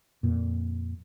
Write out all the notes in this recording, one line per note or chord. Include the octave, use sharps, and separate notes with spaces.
F2 A#2